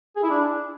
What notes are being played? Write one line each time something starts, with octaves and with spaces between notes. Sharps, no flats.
G#4
E4
D4